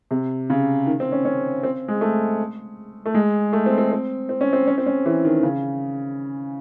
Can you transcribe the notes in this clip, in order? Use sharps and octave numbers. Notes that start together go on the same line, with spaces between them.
C3
C#3
D#3
C4
C#4
C#4
C4
G#3
A3
A3
G#3
A3
C4
C4
C4
C4
C#4
C4
C#4
C4
C#4
E3
D#3
C#3